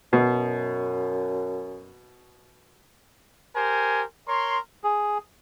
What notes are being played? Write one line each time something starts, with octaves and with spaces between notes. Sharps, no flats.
F#2 B2
G4 A#4 C5 G#5
A#4 C#5 C6
G#4